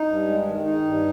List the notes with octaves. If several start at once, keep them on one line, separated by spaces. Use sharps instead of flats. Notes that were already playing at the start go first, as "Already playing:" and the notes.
Already playing: D#4
G2
G#3
D#3
D#4
G2